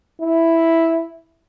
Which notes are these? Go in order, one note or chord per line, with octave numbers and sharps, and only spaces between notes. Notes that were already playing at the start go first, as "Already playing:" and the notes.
E4